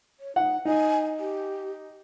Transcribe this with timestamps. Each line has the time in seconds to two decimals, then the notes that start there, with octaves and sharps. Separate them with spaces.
0.20 C#5
0.36 D#4 F#5
0.65 D#4 G#5
1.19 G4